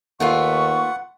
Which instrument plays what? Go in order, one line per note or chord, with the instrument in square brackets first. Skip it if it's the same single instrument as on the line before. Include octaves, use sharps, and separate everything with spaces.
[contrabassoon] D#2 [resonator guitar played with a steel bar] A3 B3 F4 [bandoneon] F#5 [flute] C#6